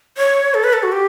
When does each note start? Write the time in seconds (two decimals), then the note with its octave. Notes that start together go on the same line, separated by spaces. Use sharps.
0.18 C#5
0.54 A4
0.64 B4
0.73 A4
0.83 F#4
0.92 G4